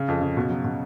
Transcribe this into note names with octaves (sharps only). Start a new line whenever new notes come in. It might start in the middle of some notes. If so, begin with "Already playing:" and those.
Already playing: C#3
F2
C#3
B2
F#3
B2